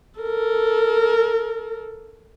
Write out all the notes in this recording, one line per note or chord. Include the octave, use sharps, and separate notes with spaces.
A4 A#4